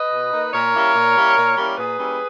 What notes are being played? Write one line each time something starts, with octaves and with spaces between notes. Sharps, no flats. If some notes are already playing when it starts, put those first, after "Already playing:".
Already playing: B4 D#5
B2
A#3 D#4
A#2 A#4 C#5
G3 A#3 C#4 E4
A#2
G3 A#3 C#4 E4
A#2
G3 A#3 C#4 E4
A#2 G#4 B4
G3 A#3 C#4 E4